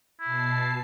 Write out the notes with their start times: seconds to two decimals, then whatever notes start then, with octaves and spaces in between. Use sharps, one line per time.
0.20 B2 E4 A5 C7